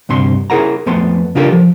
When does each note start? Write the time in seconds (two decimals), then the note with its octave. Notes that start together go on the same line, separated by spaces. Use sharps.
0.09 D2 G2 C3 C6
0.50 E4 G#4 A#4 F#5 A#5
0.86 F2 A3 B3 C6
1.35 C#3 D4 F4 G4 A4 A#4
1.52 F3